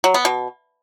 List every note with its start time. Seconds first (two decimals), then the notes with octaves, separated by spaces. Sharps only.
0.04 F#3
0.14 B3
0.25 B2